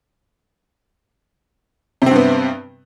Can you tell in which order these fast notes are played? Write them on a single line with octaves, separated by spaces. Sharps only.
C3 C4 G2 B3